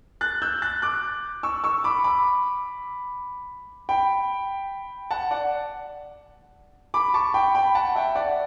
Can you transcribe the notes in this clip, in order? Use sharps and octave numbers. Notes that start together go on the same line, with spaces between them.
F#6 A6
E6 G6
F#6 A6
D6 F#6
C#6 E6
C#6 E6
B5 D6
B5 D6
G5 B5
F#5 A5
D5 F#5
B5 D6
A5 C#6
G5 B5
G5 B5
F#5 A5
E5 G5
D5 F#5